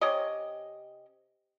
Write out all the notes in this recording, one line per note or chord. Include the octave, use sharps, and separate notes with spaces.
C3 C#4 G4 D#5